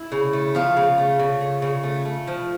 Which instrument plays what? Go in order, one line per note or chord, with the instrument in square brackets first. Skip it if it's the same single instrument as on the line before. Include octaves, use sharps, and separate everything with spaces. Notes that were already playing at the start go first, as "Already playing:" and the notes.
Already playing: [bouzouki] E4
C#3
A3
F3 F4
C#3
A3
C#3
A3
C#3
A3
A3
F3